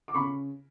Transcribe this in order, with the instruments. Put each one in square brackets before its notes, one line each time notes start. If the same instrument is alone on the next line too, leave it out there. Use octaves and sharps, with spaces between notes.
[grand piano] D6
C#3 B5 C#6